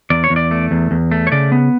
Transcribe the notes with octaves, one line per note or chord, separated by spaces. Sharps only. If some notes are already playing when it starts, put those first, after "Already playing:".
E2 D5
C#5
E2
D5
A3
E2
E2
A3
C#5
C#3 D5
B3